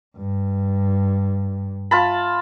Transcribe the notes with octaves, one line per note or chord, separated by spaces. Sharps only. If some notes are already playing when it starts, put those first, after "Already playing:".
G2
F4 A5 B5